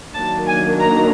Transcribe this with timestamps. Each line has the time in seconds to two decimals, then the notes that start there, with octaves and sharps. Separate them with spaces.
0.13 D#3 F#3 A#3 D4 A5
0.47 G#5
0.80 A#5